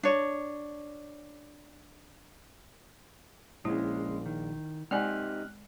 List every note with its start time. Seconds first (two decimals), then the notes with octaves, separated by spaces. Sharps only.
0.03 D4 C#5
3.65 A#1 G#3 C#4 E4
4.26 D#3
4.91 G#3 C4 D#4 G4 D5 G#5 F6 F#6